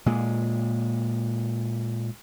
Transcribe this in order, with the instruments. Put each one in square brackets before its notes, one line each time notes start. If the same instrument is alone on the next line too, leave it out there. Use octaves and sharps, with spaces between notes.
[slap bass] A#2 G#3